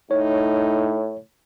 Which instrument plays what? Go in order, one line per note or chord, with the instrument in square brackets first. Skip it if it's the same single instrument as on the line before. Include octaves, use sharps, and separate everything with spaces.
[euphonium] A2 [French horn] D#4 [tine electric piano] C#5